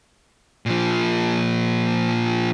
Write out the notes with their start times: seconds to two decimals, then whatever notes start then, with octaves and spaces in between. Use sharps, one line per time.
0.66 A#2 F3